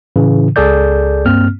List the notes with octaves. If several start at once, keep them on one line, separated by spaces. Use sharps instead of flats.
A2 C#3 E3
C#2 G#4 A4 D5 G6
G2 A#3 C4 F6